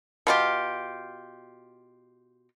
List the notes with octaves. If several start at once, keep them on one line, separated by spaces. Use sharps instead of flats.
B2 F4 G4